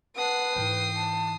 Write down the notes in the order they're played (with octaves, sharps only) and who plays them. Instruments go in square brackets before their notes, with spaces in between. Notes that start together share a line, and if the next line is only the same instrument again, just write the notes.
[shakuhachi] B4 [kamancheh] F#5 A5 [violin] D#6 C7
[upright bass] G#2 E3 [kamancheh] G5
[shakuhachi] A5